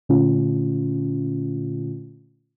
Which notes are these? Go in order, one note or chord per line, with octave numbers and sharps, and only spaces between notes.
A#2 D3 A3 C#4 F4